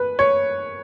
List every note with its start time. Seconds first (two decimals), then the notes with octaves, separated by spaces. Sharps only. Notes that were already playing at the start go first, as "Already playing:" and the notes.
Already playing: B4
0.19 C#5